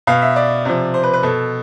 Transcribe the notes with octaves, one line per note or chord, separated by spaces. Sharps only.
B2 F5
E5
D5
C3 F3
C5
B4
B4
B2 A4